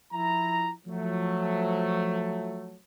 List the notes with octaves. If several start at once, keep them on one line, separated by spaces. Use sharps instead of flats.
F3 E4 A#5
F3 F#3 A3